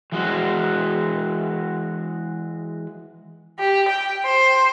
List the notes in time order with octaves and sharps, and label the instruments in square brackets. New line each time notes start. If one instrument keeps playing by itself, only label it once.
[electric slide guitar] E3 G#3 F#4
[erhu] G4
G5
C5